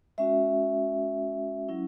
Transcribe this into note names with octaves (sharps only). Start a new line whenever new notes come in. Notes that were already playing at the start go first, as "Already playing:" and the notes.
G#3 C#4 F#4 E5
F#3 C#4 E4